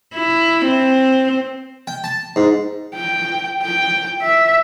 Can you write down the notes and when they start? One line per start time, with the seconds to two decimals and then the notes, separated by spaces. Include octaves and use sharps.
0.15 E4
0.66 C4
1.87 G5
2.04 A5
2.36 G#2
2.95 G5
3.63 G5
4.22 E5